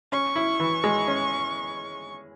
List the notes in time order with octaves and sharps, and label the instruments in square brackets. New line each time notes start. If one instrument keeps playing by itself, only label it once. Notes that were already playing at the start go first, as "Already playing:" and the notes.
[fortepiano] C#4 [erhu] C#6
[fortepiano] E4
E3
G#3
C#4